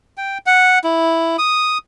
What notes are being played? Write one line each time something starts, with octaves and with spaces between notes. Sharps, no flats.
G5
F#5
E4
D#6